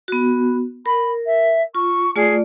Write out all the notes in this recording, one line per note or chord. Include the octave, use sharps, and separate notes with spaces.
B3 F#4
A#4 B5
E5
F4 C#6
A3 F4 G#4 D5